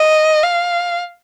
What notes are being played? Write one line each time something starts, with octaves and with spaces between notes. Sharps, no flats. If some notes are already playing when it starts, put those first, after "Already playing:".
Already playing: D#5
F5